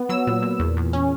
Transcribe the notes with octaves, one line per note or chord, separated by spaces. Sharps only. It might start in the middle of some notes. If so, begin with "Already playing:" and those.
Already playing: B3
F#3 E6
A#2
A#2
E2
E2
C#4